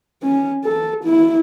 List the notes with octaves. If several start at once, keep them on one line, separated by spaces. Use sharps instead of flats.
C#4
A4
E4